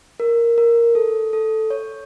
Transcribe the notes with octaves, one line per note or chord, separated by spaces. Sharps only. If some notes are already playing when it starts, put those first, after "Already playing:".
A#4
A#4
A4
A4
C#5